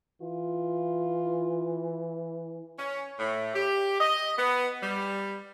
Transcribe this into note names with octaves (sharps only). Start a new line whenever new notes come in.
E3 F4
C#4
A2
G4
D#5
B3
G3